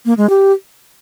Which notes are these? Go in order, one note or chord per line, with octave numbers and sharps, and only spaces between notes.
A#3
G#3
G4